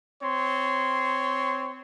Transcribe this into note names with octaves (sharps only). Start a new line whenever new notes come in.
C4 C#5 C6